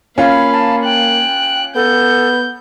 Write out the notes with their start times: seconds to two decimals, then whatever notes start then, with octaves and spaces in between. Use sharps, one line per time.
0.18 A#3 C#4 F4 F5 B5
0.53 A5
0.84 G5 F#6
1.76 B3 A4 G6